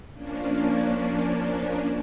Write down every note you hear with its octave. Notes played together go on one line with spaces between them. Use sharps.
F3 A#3 C#4 D4